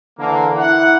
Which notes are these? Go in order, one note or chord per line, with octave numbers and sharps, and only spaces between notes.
D3 E3 A#3
E4 F#5